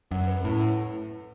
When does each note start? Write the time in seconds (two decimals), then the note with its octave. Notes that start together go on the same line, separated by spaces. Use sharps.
0.11 F#2 F#5
0.27 B4
0.44 A2 E4